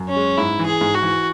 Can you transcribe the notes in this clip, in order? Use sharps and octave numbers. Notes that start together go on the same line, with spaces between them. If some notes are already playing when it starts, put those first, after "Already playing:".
Already playing: F#2
C#4
G#3
G#2 E4
E3
G#4
G#2
F#4
E3